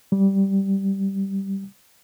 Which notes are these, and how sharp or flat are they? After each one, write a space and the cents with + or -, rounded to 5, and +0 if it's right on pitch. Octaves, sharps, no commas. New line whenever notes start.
G3 -10